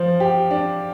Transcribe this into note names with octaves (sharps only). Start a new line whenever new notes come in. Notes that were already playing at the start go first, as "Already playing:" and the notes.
Already playing: F3 C5
G4
D4